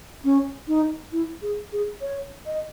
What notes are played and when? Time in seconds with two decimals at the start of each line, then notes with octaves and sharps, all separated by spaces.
0.24 C#4
0.68 D#4
1.12 E4
1.42 G#4
1.72 G#4
2.01 C#5
2.46 D#5